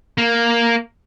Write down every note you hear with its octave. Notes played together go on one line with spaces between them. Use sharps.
A#3